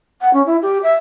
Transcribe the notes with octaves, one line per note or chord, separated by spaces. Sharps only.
F#5
C#4
E4
G4
E5